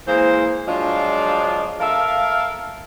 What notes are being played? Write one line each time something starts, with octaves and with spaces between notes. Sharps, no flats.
E3 G#3 A#3 C5
F3 F#3 G#3 D4 F4 D5
A4 A#4 E5 F5